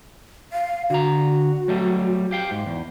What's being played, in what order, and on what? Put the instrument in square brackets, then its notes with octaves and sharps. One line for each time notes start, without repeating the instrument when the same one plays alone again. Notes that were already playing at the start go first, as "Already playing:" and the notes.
[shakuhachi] F5
[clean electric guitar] D3 A#5 [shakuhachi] F#4
[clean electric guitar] F#3 G3 A3
G4 F5 G5
G#2
E2